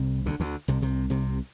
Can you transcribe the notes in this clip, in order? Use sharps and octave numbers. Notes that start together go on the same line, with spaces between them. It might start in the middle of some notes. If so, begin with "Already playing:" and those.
Already playing: C2 C3
D2 D3
D2 D3
C2 C3
C2 C3
C2 C3